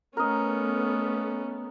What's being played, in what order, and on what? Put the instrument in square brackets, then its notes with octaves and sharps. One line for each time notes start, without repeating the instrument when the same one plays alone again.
[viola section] A3 B3 [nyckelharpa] C#4 [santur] A#4 D#5